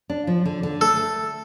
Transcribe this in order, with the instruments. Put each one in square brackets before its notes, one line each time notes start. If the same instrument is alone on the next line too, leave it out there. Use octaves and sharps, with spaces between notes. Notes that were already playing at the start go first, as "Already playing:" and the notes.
[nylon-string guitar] D4
F3
D3
D3
[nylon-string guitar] A3 [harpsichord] A4